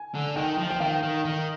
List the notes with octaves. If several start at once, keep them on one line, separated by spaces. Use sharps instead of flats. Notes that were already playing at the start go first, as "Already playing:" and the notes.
Already playing: G#5
D3
D#3 G5
F3
G5
D#3 F5
D#3
D#3